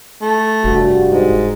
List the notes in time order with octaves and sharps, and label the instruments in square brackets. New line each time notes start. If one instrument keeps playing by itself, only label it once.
[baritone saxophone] A3
[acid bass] F1 [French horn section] G2 G3 F#4
[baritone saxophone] G#2